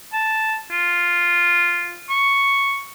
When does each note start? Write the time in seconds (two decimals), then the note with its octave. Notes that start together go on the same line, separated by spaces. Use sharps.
0.13 A5
0.71 F4
2.09 C#6